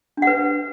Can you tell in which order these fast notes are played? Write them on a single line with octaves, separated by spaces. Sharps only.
D4 F#5 B4